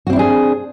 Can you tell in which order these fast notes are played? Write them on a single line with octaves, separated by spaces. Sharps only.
F#4 C4 E4 D4 G#4